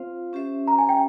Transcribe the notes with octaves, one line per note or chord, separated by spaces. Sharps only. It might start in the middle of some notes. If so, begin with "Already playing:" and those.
Already playing: C4 F4 C5 F5
C#4 G4 C5 E5
A#5
G#5
G5